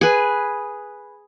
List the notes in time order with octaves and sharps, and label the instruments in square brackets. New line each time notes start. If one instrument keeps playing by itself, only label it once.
[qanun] G#4 B4